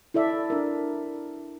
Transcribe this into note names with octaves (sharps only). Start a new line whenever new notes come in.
E4 A4 D5 E5
D4 A#4